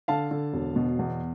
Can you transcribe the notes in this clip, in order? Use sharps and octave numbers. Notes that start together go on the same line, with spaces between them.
D3 F5 A5
D3
E1
B2
E2